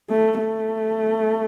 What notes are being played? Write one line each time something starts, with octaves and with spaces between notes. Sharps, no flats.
A3
A3